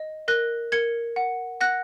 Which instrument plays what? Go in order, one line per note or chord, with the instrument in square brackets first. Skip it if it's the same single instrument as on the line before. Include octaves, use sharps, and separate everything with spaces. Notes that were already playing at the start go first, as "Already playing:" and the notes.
Already playing: [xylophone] D#5
A#4 F#6 A#6
A#4 G#6 C#7
F#5
F#5 F#6 A#6